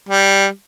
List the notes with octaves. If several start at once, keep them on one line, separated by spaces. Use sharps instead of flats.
G3